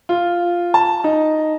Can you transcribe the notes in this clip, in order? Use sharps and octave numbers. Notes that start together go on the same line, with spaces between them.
F4
A5
D#4